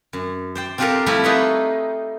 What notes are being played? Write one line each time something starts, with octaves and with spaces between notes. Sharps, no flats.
F#2
C5 D5 G5
C4 D4 F4 G4 A4 A#4
F3 G3 A3 C4 E4 A4
D#4 F4 B4 C#5 D#5 E5